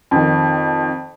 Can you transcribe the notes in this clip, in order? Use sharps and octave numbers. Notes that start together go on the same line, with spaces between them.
F2 D#3